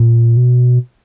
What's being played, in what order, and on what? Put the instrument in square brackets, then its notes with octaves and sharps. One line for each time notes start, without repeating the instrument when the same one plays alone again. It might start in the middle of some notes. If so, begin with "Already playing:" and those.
Already playing: [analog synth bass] A#2
B2